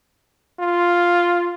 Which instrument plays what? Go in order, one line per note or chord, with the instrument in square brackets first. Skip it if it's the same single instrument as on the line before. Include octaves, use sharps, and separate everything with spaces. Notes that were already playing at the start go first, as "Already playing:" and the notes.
[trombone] F4